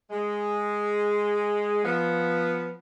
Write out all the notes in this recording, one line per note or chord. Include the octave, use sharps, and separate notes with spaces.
G#3
F3 B3